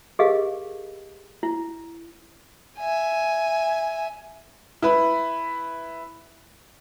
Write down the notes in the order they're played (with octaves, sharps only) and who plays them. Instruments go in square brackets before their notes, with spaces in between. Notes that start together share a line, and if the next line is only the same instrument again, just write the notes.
[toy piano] G4 G#4 A#4 D#5 F5
E4
[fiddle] E5 G#5
[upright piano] E4 B4